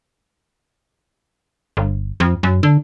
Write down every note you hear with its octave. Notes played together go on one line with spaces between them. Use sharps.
G1
F2
F#2
D3